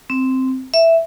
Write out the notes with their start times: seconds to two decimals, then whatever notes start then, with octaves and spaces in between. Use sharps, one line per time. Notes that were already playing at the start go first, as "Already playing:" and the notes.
0.10 C4
0.74 E5